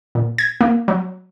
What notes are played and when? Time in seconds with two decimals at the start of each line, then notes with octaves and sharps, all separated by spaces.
0.15 A#2
0.38 G#6
0.61 A#3
0.88 F#3